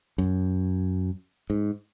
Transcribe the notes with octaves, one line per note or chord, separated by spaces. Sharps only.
F#2
G#2